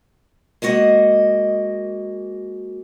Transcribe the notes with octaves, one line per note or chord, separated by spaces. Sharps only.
G#3 A#3 F#4 D#5